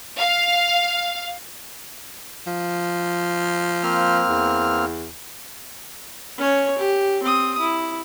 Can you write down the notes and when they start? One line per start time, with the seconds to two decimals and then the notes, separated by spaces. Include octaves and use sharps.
0.19 F5
2.47 F3
3.83 A#3 C4 F6
4.29 E2
6.38 C#4 C#5
6.78 G4
7.23 C4 D#6
7.59 E4